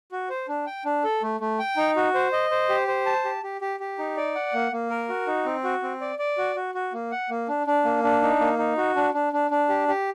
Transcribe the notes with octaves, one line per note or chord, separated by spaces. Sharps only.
F#4
C5
D4
G5
D4
A4
A3
A3
G5
D#4
F#4
C5
D#5
C5
G4
C5
A5
G4
G4
G4
G4
D#4
D5
F#5
A#3
A#3
A#4
F#4
D#4
C4
F#4
C4
D5
D5
F#4
F#4
F#4
A#3
F#5
A#3
D4
D4
A#3
D4
D#4
A#3
D#4
F#4
D4
D4
D4
D4
G4
G4